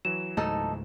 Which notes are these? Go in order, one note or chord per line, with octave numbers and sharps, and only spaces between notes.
E3 F#3 E7
C#2 G#2 A3 D#4 A4 A5